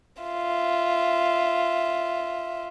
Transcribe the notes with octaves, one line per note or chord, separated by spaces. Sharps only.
F4 E5